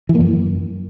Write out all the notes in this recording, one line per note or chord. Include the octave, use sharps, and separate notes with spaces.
E3
A#3
F#2